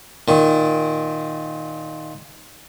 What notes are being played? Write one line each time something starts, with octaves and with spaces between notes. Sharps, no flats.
A#2 D#3